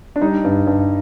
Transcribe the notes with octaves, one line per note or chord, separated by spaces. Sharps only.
D4
G3 D#4
G2
G2